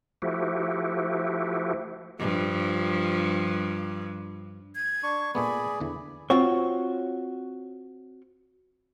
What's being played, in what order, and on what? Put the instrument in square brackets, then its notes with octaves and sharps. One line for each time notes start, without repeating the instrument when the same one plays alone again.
[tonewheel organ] F3 A3 E4 F#4 G4
[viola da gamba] G2 F3
[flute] G#6
[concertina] D4 C#6
[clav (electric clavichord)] A#2 A3 B3 [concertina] G#4 D5 [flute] B5
[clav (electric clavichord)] E2 D3 E3
[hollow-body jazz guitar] C4 F4 F#4 C#5